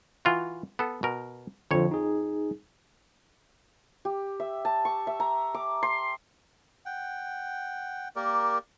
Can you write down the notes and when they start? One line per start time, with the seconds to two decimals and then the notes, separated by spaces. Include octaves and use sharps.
0.25 E3 F4 F#4
0.79 B3 A4
1.03 B2 A#4
1.71 F2 D3 F3 C#5
1.91 D#4 G#4
4.05 G4
4.40 E5
4.65 A5
4.85 C#6
5.07 E5
5.20 A#5
5.54 D6
5.83 C6
6.86 F#5 G5
8.16 A#3 G4 A#4 D5